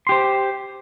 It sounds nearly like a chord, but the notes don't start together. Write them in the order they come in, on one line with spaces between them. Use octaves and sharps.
C6 G4 C5